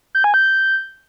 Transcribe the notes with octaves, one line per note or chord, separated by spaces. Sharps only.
G6
G#5
G6